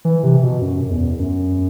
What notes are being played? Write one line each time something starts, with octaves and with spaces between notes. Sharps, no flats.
E3
C3
B2
F#2
E2
F#2